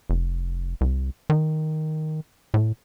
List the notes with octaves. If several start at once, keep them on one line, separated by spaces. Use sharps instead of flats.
F1
C2
D#3
A2